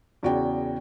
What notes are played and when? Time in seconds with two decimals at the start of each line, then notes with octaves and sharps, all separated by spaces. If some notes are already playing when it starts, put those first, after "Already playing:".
0.23 E2 C#3 F#4 D5 G5